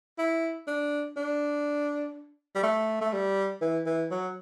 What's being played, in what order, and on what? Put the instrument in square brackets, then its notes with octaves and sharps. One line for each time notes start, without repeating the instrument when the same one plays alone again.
[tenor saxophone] E4
D4
D4
G3
A3
A3
G3
E3
E3
F#3